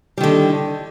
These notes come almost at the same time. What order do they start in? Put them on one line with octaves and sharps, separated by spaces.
G3 D#3 D3